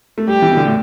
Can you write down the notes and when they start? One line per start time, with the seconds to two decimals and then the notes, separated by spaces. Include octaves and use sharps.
0.18 A3
0.28 G3 G4
0.42 E3
0.52 B2
0.57 D3
0.66 A2